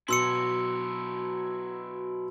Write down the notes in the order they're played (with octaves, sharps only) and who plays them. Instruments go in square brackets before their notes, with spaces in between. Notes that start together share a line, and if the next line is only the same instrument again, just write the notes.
[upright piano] B2 [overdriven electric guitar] F#3 E4 [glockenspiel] C6 E6 C#7